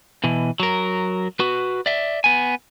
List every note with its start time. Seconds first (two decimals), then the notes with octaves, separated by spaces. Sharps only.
0.24 B2 E3
0.60 F#3 A#4
1.40 F#4 B4
1.86 D5 E5
2.24 B3 G#5